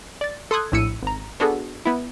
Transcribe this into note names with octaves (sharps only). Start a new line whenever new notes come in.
D5 A6
A4 C6 D#6 F#6 G#6
A#1 A2 E4 E6 C#7 D#7
G#1 A#5
B3 D4 F#4 G#4 A4
B3 E4